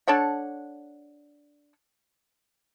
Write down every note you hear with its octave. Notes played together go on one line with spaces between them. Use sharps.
D4 A4 C#5 F#5